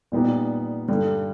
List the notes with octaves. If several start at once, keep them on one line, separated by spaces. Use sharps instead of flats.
A#2 G3 B3 D#4 G4
G2 D3 G3